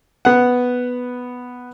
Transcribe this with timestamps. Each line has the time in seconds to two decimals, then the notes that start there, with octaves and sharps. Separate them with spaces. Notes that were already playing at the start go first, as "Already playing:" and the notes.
0.25 B3 F#5